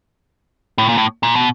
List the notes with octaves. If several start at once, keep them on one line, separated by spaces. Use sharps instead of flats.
A2
A#2
A2
A#2
B2